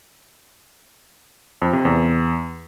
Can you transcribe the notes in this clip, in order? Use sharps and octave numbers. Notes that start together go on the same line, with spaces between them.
F2
C3
E2